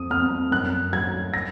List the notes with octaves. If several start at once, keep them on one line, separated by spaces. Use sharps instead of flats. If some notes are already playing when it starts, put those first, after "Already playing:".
Already playing: F2 D#6
F2 F6
F#2 F#6
F#3 G#6
A#6